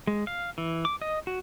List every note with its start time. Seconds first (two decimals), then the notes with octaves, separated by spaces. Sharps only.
0.07 G#3
0.27 F5
0.58 E3
0.85 D6
1.02 D#5
1.27 F#4